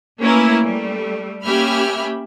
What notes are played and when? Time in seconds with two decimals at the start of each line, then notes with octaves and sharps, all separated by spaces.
0.21 A3 A#3 C#4 E4 A#4 B4
0.64 G3 A3
1.43 A#3 C#4 G4 E5 B5 F6